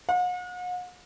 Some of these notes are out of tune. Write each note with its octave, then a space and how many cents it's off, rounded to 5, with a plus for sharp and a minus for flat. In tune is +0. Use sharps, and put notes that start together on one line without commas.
F#5 -45